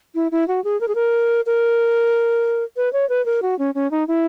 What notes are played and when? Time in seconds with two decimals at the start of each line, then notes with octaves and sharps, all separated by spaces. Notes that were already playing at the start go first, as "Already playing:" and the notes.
0.15 E4
0.32 E4
0.48 F#4
0.64 G#4
0.81 A#4
0.88 G#4
0.95 A#4
1.46 A#4
2.77 B4
2.93 C#5
3.09 B4
3.26 A#4
3.42 F#4
3.59 C#4
3.75 C#4
3.91 D#4
4.08 E4